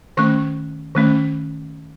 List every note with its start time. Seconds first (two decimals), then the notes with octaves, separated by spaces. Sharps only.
0.17 D#3 A3 C#4 C#6
0.95 D#3 A3 C#4